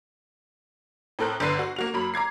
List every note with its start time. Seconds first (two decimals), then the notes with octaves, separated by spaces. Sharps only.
1.19 A2 C4 A4 A#4 F#6
1.40 G1 D3 B4 C7
1.59 F#4
1.76 A#3 F#4 F7
1.94 F#2 F#3 A#3 B5
2.14 A#5 D6 G#6 C7